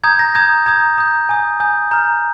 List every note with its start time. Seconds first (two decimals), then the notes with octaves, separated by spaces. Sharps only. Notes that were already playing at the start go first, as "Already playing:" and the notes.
0.04 A#5 D#6 G6 G#6
0.19 A#6
0.35 A#5 D#6 G6 G#6
0.66 A#5 D#6 G6 G#6
0.98 A#5 D#6 G6
1.29 G#5 D#6 G6
1.60 G#5 D#6 G6
1.91 A#5 F6 G6